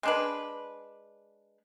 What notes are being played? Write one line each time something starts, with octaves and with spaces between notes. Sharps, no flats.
G#3 D4 B4